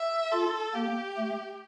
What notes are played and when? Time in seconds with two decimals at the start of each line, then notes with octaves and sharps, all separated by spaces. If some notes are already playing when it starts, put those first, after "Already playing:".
Already playing: E5
0.32 F4 A4
0.75 A#3 G4
1.17 A3